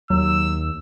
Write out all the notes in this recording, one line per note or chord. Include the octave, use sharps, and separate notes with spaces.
D#2 F#3 E6